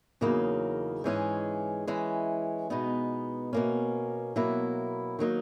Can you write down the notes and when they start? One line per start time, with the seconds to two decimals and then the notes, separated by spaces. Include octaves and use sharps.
0.21 E2 C#3 F#3 A#3 D#4
1.04 G#2 E3 G#3 C#4 G#4
1.87 E3 G#3 C#4
2.70 B2 G#3 B3 D#4
3.53 B2 A#3 C#4
4.36 B2 F#3 A#3 E4
5.19 D#3 F#3 A#3 D#4